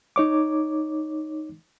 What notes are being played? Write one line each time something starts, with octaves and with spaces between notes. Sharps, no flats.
D#4 C#5 D6